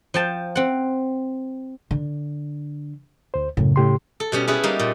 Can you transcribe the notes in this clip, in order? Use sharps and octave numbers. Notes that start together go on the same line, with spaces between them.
F3 G5 A5
C4 F#5
D3
D2 C5
F#2 A2 C#3
A2 G4 C6
A4
B2 G3 C#4
C#4 E4 G#4 B4
G3 A#3 D#4
A#2